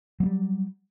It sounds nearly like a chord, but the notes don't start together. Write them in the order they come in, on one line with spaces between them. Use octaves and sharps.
F#3 A#3 G3